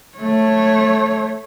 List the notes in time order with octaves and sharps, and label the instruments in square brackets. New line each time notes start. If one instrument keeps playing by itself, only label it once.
[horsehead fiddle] A3 C#5